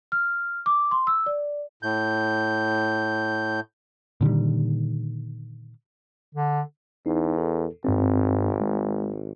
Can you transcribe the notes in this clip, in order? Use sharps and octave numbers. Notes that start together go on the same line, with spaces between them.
F6
D6
C6
E6
D5
A2 G6
A#2 D3 D#3 G3
D3
E2 D#4
A4
G#1 G2 C4
G#3